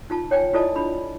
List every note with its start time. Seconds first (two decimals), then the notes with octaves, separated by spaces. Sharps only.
0.10 D#4 F4 A5
0.31 C#5 G5 G#5
0.53 E4 F4 A4 D5 D#5 A5
0.76 D4 B5